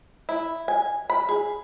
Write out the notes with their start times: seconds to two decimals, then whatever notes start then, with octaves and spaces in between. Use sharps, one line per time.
0.29 E4
0.68 G#5
1.10 B5
1.29 G#4